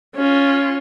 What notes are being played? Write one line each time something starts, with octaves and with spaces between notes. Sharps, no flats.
C#4 F4